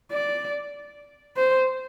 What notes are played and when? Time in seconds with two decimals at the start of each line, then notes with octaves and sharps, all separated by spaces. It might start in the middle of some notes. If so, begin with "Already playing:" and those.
0.11 D5
1.36 C5